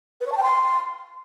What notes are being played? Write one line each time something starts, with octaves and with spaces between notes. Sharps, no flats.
B4
C#5
A5
G5
C6